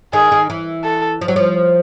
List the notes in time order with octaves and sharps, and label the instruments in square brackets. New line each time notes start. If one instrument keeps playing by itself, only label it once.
[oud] D#3 [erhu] G#4
[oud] D#3
E3
[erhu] A4
[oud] F3
F#3
F3